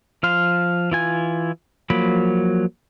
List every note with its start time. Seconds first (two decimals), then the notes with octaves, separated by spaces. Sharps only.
0.23 F3 F5 C6
0.91 E3 F4 G#5
1.90 F3 F#3 A#3 B5